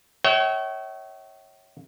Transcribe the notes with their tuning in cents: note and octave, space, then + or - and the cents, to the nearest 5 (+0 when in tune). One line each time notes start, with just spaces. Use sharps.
C#5 -5 E5 -30 G5 -45